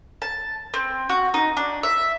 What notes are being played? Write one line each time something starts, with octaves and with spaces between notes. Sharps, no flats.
A5
C4
F#4
D#4
D4
E5